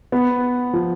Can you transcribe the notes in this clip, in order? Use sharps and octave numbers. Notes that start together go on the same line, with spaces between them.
B3
F3